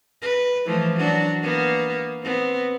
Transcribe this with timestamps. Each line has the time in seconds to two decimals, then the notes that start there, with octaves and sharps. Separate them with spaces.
0.22 B4
0.66 E3 F3 A3
0.97 F#3 D4 F#4
1.43 A#3 B3
2.22 B3 C4